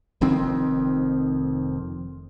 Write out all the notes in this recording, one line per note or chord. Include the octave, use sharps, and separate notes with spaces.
F1 F2 D#3 C4